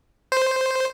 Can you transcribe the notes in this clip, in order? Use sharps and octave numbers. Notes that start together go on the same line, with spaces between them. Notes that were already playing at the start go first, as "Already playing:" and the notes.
C5